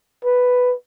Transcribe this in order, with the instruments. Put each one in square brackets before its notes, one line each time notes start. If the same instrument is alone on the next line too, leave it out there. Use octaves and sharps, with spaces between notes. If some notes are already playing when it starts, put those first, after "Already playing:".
[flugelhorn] B4